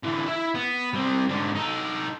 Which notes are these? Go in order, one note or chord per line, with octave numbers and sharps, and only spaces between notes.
D3 E3
E4 E5
B3
G3 C4
G#2 D3
D#4 A4